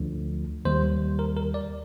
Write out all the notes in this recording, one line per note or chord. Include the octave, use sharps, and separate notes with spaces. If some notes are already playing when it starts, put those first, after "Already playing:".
Already playing: D2 D3 F3
D#2 D#3 G3 C5
A#4
A#4
D5